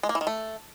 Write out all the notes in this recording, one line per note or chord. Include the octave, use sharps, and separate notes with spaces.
G#3
A#3
E3
D#3
A3